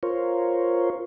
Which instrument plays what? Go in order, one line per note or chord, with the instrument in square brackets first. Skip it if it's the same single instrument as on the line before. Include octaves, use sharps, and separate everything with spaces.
[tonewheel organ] F4 A#4 C5 C#5